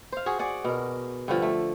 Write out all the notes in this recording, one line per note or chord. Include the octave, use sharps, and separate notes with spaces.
C5 F5
F#4 G#4
G#4 D5 F#5
B2 A#4
G2 D3 F3
A3